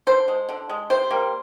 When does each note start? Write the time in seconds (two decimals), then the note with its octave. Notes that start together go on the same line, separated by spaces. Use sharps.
0.07 D3 C5
0.28 G#3
0.49 D3
0.69 G#3
0.90 C3 C5
1.11 G3 A#3